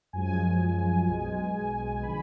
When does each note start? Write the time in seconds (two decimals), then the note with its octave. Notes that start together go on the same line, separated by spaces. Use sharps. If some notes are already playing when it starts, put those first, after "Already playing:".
0.13 F#2 F3 G#3 G#5
1.08 B1 B2 G#3
2.03 D3 F3 B5